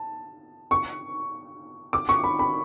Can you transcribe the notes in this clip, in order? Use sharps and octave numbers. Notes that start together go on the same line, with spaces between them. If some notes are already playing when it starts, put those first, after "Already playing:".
Already playing: A5
C#6
D6
C#6
B5
B5